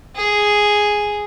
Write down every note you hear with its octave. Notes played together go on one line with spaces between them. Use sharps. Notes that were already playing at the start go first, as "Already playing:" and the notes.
G#4